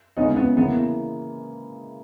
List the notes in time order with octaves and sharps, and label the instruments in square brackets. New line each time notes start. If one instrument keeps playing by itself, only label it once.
[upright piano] C#3 G#3 C#4 E4 [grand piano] B3 D#4
[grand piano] B3
[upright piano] C#3 E3 A#3 E4 [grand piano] B3